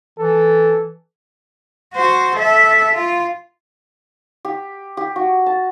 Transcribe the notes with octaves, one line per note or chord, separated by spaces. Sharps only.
E3 A4
F#4 C5
A4 E5
F4
G4
G4
F#4
A5